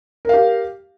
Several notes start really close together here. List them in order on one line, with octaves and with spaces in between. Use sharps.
A#4 F5 G4